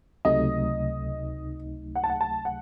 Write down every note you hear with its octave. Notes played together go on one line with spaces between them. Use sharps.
C#2 C3 F#3 A3 D#4 D#5
F#5
A5
F#5
A5
F#5